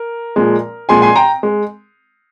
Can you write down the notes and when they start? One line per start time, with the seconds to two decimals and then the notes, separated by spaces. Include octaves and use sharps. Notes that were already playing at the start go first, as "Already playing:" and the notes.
Already playing: A#4
0.36 A#2 F3 G#3
0.89 A#2 F3 G#3 G#5 C6
1.02 G#5 C6
1.16 G5 A#5
1.43 G#3